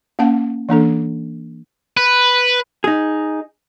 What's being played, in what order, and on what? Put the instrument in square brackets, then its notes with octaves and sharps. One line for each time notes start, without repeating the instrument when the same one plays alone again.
[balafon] A#3 C#4 F5 F#5 A5
E3 A#3 D4 A4
[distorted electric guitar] B4
[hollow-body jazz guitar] D#4 G#4